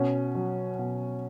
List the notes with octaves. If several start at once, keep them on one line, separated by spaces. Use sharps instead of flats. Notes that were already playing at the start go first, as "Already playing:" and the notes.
Already playing: B2 C#4
F#3
B2